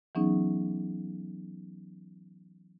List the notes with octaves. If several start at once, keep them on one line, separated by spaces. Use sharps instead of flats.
E3 F#3 B3 C#4 D#4 G#4